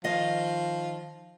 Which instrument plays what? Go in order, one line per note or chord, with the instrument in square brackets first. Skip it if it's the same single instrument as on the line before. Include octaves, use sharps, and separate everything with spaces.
[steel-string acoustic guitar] D#3 D#5 F5 [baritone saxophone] F3